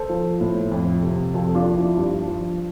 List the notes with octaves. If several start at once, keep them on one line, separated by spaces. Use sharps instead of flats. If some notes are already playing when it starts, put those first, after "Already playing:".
Already playing: A4 C5
F3
A2
F2
C3
F2 F4 A4
D4 F4
F3
E4
G2 D4
F3